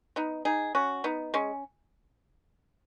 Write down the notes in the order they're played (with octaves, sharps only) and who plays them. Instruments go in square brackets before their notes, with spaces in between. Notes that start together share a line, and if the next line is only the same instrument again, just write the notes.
[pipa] B3 D#4
D#4 G#4
C#4 F#4
B3 D#4
G#3 C#4